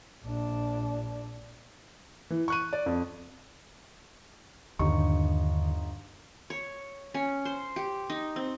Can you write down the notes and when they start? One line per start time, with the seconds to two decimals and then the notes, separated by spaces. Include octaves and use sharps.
0.23 A#1 D4
2.30 E3
2.48 C#6 F#6 D#7
2.73 D5
2.86 F2
4.79 G1 D#2 D3 D#4 C#6
6.50 C#5
7.14 C#4
7.45 C5
7.76 G4
8.10 D#4
8.36 C4